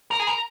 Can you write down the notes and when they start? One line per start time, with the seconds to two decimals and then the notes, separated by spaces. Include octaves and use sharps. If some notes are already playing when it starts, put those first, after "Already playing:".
0.11 A#4
0.19 G#4
0.27 A#4